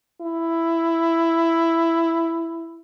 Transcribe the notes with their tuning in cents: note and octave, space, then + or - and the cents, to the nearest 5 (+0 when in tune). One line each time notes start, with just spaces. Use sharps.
E4 +10